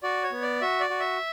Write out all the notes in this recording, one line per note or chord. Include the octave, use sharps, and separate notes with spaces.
F#4 D5
C#5
B3
D5
F#4 E5
D5
F#4
E5